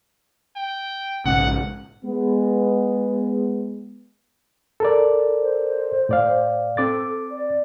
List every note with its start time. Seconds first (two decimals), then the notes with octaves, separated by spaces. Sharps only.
0.56 G5
1.26 A#1 G#2 C#3 F#5
2.05 G#3 B3
4.80 A4 A#4 D5
5.41 C5
6.09 A2 D5 F5
6.77 C4 A4 D6 A6
7.31 D5